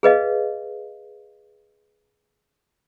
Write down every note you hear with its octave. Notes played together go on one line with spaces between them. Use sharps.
G#4 B4 D#5 F5